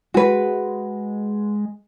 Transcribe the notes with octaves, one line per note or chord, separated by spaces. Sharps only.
G#3 F#4 B4